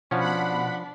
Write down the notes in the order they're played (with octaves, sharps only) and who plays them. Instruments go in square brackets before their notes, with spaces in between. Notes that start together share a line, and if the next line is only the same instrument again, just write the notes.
[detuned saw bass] B2 [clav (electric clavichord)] F3 C#4 [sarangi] D4 [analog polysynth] F#5 B5